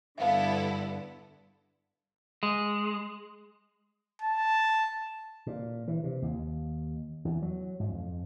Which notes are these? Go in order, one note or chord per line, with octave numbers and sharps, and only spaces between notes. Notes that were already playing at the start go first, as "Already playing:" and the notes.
G2 D3 B3 E4 A4 E5 F5
G#3
A5
A#2
E3
C3
D#2
E2
F#3
G#2
F2